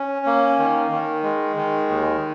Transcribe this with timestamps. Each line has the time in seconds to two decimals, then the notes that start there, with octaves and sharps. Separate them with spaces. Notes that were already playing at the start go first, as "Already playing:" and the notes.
Already playing: C#4
0.26 A#3
0.59 D#3
0.91 D#3
1.23 G#3
1.56 D#3
1.88 D#2